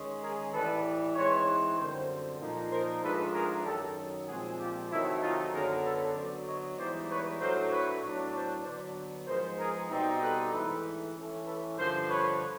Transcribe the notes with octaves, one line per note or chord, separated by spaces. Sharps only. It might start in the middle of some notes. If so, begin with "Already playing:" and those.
Already playing: D#3 G#3 C#4
G#4 A#4
A2 E3 G3 A4 B4
E3 G#3 C4 D#4 B4 C#5
F#2 D3 G3 C4 A#4 C5
A#2 F3 A#3 D#4
A#4 C5
G#2 F3 A3 D4 A4 B4
G#4 A#4
F#2 D#3 F#3 G4 A4
A#2 F3 G#3 C4 F#4 G#4
F4 G4
C3 D#3 F#3 A3 C4 E4
D#4 F4
F#2 D3 F#3 B3 G#4 A#4
A4 B4
D3 F#3 B3 C5 D5
C#5 D#5
G#2 E3 G3 B3 D#4 C5 D5
B4 C#5
A2 F#3 A3 D4 A#4 C5
B4 C#5
A2 F#3 B3 D4
C5 D5
D3 F#3 B3 C5 D5
G#2 F3 G#3 B3 A#4 C5
G#4 A#4
B2 G3 C4 D#4
A4 B4
G#2 E3 A3 A4 B4
E3 A3 C#4
A4 B4
G2 D3 F3 A#4 C5
B4 C#5